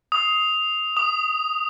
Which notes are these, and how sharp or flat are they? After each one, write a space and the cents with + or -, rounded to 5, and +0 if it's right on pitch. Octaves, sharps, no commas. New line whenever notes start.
D#6 +15
D#6 -10